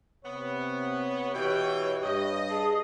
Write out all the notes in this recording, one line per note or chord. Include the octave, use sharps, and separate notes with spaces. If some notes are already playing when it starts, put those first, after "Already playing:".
C3 B3 C#5
B2 E3 G4 G5
G2 D#5
G#4 A5